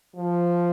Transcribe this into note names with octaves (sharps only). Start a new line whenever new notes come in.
F3